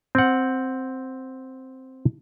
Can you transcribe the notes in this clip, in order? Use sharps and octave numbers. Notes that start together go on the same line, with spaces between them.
C4 F#5